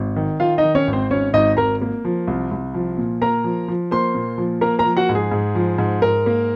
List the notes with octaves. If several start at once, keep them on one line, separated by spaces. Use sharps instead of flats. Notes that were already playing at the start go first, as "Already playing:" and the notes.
Already playing: G#1
D#3
D#3 F4 F5
D#4 D#5
D#3
C#4 C#5
G#1
C4 C5
G#1 C#4 C#5
G#1 D#4 D#5
G#1 A#4 A#5
A#3
F3
C2
C2
F3
A#2
A#3 A#4 A#5
F3
F3
A#3 C5 C6
A#2
F3
A#3 A#4 A#5
A#4 A#5
F3
F#4 F#5
G#2
G#4
G#2
F3
G#2
G#2 A#4
A#3